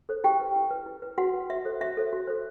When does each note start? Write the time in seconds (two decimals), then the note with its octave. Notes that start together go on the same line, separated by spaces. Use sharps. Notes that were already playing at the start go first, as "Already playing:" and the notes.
0.09 A4 C5
0.24 E4 G4 G5
0.40 B4
0.56 E4
0.71 B4
0.86 E4
1.02 B4
1.18 E4 F#4 F#5
1.34 B4
1.50 F#4 E5
1.65 A4 C5
1.81 F#4 E5
1.97 A4 C5
2.13 F#4
2.27 A4 C5